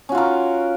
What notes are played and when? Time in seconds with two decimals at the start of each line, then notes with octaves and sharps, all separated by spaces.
0.09 C#4
0.12 F#4
0.15 F4
0.18 A#4